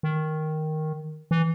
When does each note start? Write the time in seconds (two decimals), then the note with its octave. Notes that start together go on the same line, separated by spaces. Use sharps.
0.03 D#3
1.31 E3